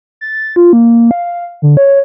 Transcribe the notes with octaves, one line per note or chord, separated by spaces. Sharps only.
A6
F4
A#3
F5
D3
C#5